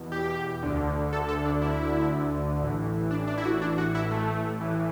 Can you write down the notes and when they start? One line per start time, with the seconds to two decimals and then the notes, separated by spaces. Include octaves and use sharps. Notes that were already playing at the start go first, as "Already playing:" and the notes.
Already playing: E2 B2
0.12 G4
0.63 D2 D3
1.13 A4
1.29 A4
1.45 D4
1.62 E4
2.61 A1 A2 E3
3.11 D4
3.28 D4
3.38 E4
3.45 F#4
3.62 D4
3.78 F#4
3.95 E4
4.11 A3
4.61 A1 A2 E3